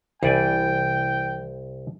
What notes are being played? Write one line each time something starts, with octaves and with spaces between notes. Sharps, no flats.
C2 E3 D5 G5 G#5